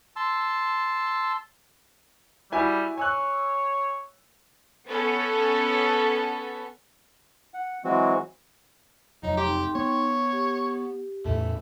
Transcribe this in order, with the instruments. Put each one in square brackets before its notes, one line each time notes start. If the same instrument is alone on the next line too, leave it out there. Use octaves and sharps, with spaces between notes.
[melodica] A5 C6 E6
[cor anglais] G3 [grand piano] E4 F#4 G#5
[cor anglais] C#5 [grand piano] G#5 E6 F#6
[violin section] B3 C#4 A4
[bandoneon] F#5
E3 F#3 G#3 C4 F#4
[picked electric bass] F1 [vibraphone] F#3 C#5 A#5 [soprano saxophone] D#4
[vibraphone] D#4 G5 C6 [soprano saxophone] G4
[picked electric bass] B3 [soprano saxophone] C#5
[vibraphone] G4
[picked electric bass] E2 A2 [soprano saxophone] A3